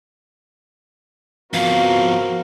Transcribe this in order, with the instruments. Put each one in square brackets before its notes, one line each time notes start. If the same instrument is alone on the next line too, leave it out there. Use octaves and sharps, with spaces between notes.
[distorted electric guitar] F3 B3 [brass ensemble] C4 A#4 [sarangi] F#4 [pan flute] F5